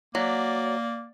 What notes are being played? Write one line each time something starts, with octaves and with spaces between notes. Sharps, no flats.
F#3 A#3 D5